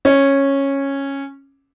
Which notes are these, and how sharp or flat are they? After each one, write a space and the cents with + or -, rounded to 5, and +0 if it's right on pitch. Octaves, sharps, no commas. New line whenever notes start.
C#4 -10